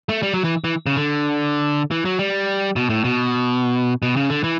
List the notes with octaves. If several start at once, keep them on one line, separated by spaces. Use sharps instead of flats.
A3
G3
F#3
E3
E3
C#3
D3
E3
F#3
G3
B2
A2
B2
B2
C#3
D3
E3